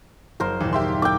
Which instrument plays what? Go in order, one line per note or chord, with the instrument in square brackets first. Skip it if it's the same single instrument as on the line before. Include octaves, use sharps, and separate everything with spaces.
[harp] F#1 [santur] A#4 C5
[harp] D#2 A#2 [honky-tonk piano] E3
[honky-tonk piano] G4 E5 C6
[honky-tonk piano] E4 [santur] G5 D6